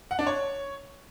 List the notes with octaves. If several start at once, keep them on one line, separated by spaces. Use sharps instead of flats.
F#5
D4
C#5